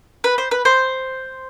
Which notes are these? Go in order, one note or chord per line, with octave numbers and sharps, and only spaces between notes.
B4
C5
B4
C5